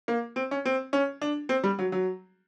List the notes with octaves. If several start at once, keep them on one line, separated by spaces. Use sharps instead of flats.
A#3
C4
C#4
C4
C#4
D4
C4
G3
F#3
F#3